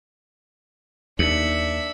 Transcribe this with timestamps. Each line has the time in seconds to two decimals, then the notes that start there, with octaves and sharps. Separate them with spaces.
1.19 D#2 D4 E5 C#7 F#7